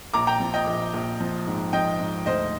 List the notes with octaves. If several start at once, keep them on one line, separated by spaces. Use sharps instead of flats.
A#1 A#5 D6
G5 A#5
F3
D#5 G5
A#1
A#1
F3
G#2
F3 D#5 G5
G#2
D2 C5 D#5